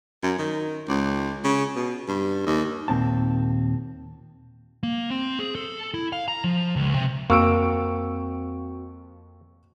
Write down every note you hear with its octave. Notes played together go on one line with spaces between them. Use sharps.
F#2
D#3
C#2
C#3
B2
G2
D#2
D#2 A#2 C4 A5
A#3
C4
G#4
A4
E4
F5
A#5
F3
C#2
C3
F2 A#3 C4 F#4 C#6 E6 D7